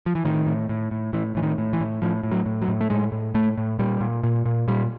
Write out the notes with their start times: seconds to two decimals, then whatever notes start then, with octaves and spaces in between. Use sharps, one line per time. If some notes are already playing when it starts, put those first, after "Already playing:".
0.06 F3
0.15 E3
0.25 A2 D#3
0.46 A2
0.69 A2
0.91 A2
1.13 A2 E3
1.35 A2 E3
1.42 D#3
1.58 A2
1.73 E3
1.80 A2
2.02 A2 F3
2.24 A2
2.31 F#3
2.46 A2
2.62 F#3
2.68 A2
2.81 A3
2.90 A2 G#3
3.12 A2
3.35 A2 A3
3.58 A2
3.79 A#2 G3
4.01 A#2
4.24 A#2
4.46 A#2
4.68 A#2 G3